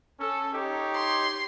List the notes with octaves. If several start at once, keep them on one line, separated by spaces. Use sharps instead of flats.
C#4 A4
D#4 G4 C#5
C6